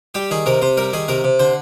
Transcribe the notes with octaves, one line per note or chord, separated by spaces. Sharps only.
G3 G4
D#3 G#4
C3 A#4
C3 C5
G3 A#4
D#3 G#4
C3 A#4
C3
D3 C5